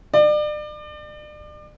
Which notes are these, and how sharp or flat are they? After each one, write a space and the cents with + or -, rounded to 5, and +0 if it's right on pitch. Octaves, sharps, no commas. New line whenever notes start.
D5 +35